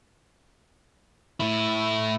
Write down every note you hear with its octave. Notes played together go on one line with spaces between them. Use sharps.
A2 E4